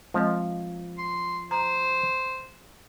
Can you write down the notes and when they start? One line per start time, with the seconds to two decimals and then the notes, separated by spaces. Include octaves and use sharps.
0.14 F3 G#3 C4 D#5
0.98 C6
1.51 C5 A#5